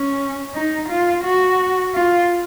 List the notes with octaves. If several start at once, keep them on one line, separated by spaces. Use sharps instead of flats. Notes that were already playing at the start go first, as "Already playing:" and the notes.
Already playing: C#4
D#4
F4
F#4
F4